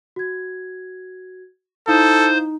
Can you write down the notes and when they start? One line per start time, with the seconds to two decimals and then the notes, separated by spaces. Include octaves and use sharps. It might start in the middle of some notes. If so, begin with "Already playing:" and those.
0.16 F#4 G#6
1.88 D#4 E4 A4 C5 F5 D#6